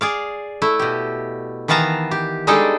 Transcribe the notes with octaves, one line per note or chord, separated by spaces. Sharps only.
G#4 D5 F5
A3 E4
B2 G4
D#3 E3 B3 F5 A5 A#5
G4
G3 G#3 D4 D#4 G#4 A4